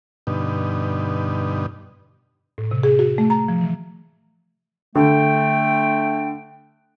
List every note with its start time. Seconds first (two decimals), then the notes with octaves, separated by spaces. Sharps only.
0.27 G2 B2 D3 D#4
2.58 A2
2.71 C3
2.83 G#4
2.99 F#4
3.18 A3
3.30 A#5
3.49 F3
3.61 E3
4.96 D3 A3 G5